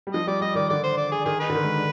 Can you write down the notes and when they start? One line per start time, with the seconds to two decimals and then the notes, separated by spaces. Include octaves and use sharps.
0.07 G3
0.14 F3 D#5
0.27 G3 D5
0.41 G3 D#5
0.55 D#3 D5
0.70 D3 D5
0.84 C5
0.97 D5
1.12 G#4
1.26 D#3 G#4
1.41 D#4 G#4 B4
1.50 D3
1.55 D#3
1.64 G#3
1.77 D4